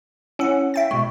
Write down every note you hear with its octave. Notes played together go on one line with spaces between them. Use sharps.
C#4 E4 C#5 F#5
E5 G5 A6
B2 G#3 C#6